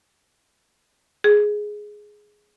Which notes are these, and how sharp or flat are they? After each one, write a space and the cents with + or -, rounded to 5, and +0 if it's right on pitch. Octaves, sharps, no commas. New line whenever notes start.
G#4 +5